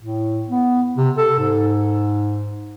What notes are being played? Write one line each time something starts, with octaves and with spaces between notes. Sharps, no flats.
A2
B3
C3
A4
G#2